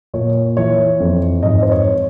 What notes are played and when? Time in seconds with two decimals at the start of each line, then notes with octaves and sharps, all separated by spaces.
0.14 A#2 C#5
0.57 E3 C#5
1.00 F2
1.43 G#2 D#5
1.62 C5
1.72 C#5